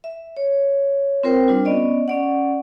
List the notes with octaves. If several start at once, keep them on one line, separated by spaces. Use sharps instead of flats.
E5
C#5
C4 F4 A#4 C5 G5
G3 D4 F4
B3 C#4 D5 D#5
C#4 D5 F#5